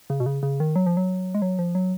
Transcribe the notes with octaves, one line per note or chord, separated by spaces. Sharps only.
C#3
B2
C#3
C#3
D#3
F#3
F3
F#3
G#3
F#3
F3
F#3